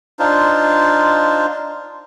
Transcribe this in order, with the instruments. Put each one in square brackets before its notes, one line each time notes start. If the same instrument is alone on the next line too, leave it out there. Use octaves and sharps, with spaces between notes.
[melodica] D4 D#4 F4 C5